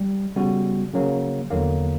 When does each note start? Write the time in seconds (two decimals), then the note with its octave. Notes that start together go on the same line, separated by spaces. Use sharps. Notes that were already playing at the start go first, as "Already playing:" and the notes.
Already playing: G3
0.36 C#3 G3 B3 F#4
0.94 C#3 F#3 A#3
1.51 E2 D3 F#3 A#3